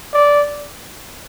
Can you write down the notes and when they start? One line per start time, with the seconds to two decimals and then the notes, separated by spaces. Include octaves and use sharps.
0.13 D5